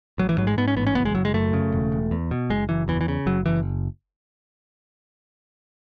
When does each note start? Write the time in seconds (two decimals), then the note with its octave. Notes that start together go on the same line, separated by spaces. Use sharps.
0.18 A1 F#3
0.29 E3
0.37 G#2 F#3
0.47 G#3
0.58 G#2 B3
0.68 C#4
0.76 A1 B3
0.87 C#4
0.95 F#1 B3
1.05 G#3
1.15 F#1 F#3
1.25 G#3
1.34 F#2 A3
1.53 C#3
1.72 E1
1.92 E1
2.11 E2
2.31 B2
2.50 F#1 G#3
2.69 F#1 E3
2.88 E2 E3
3.01 E3
3.08 C#3
3.26 F#1 F#3
3.46 F#1 E3